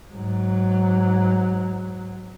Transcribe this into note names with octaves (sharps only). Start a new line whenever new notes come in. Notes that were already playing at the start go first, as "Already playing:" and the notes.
G#2 F#3